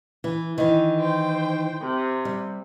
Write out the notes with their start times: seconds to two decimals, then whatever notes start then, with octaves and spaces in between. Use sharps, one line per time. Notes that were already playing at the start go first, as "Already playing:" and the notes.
0.24 E3
0.58 D#3 E3
0.98 C5 G5
1.81 C3
2.25 G3